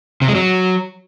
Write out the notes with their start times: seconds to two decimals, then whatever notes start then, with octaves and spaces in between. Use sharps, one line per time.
0.22 C3
0.28 G#3
0.35 F#3